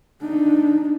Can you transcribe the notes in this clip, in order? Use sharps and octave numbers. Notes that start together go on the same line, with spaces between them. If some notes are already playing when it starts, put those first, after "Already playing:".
D4 D#4